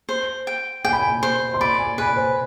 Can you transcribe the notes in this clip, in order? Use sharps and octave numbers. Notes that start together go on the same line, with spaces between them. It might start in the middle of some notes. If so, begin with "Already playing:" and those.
C5
G5
G5 G#5
B5
G#5
C5
C6
D5 B5
G#5
B4 G#5
C5